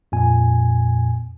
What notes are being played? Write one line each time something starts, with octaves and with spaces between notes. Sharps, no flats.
F2 A#2 G#5